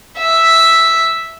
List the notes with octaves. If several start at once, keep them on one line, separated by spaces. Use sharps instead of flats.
E5